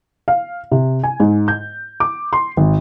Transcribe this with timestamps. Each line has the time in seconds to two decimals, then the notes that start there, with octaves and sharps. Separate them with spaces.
0.28 F5
0.72 C3
1.03 G#5
1.20 G#2
1.48 G6
2.00 D6
2.33 C6
2.57 G#1